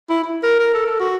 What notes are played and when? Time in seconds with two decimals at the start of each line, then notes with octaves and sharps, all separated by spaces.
0.09 E4
0.24 E4
0.43 A#4
0.59 A#4
0.73 A4
0.86 A4
1.00 F#4